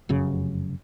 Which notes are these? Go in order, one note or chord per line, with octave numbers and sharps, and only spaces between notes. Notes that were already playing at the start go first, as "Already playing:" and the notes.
F1 F#2 C#3